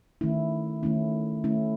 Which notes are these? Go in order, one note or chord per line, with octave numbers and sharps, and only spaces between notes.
D#3 A3 C#4 E4
D#3 A3 C#4 E4
D#3 A3 C#4 E4